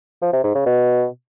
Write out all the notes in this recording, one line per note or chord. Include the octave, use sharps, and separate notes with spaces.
F3
C3
G#2
C#3
B2